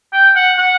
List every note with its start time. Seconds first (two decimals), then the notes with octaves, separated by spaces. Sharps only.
0.13 G5
0.36 F#5
0.58 F#5